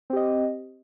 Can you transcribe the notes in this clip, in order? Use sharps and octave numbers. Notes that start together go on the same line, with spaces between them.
C4 G4 D#5